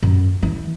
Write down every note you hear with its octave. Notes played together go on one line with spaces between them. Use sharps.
F#2
E3